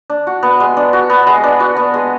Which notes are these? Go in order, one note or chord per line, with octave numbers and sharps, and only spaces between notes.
D4
F#4
B3
G#3
D4
F#4
B3
G#3
D4
F#4
B3
G#3